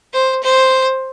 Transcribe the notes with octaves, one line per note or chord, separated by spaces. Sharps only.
C5
C5